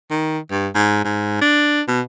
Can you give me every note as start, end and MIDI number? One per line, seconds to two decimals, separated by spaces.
0.11 0.39 51
0.51 0.68 43
0.75 1.01 44
1.04 1.37 44
1.41 1.82 62
1.88 2.01 47